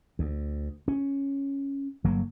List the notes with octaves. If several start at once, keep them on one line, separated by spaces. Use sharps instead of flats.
D2
C#4
G1 F#3 A#3